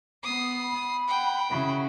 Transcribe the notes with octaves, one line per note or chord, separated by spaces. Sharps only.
B3 D#6 C7
B5
F#5 G5
C#3 E4 F#4